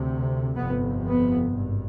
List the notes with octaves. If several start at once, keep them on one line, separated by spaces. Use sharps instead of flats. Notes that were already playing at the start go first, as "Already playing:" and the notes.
Already playing: D2 C3
G1 F2 C3 B3
B3
G#1 G2